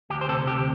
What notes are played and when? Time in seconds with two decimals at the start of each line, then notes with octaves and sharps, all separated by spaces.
0.10 D2 G4
0.21 C5
0.28 C3 A4
0.47 D2 G4